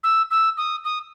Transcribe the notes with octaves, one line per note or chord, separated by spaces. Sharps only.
E6
E6
D#6
D#6